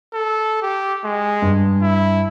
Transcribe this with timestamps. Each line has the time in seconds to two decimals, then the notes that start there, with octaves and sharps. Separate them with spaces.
0.14 A4
0.62 G4
1.04 G#3
1.42 G2
1.82 E4